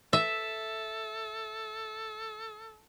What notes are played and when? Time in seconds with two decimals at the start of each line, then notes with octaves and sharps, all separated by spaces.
0.13 A4 E5